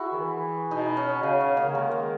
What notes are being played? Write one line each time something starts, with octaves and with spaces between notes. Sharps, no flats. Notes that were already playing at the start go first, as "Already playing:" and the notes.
Already playing: E4 F#4 G#4
D#3
E3
B2 D#4
C#4
C#3 C#4
C#4
A#3
C#3
D#3 G#3
A#3